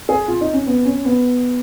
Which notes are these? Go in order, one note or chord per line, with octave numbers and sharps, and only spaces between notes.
G#4
F4
D#4
C#4
B3
C#4
B3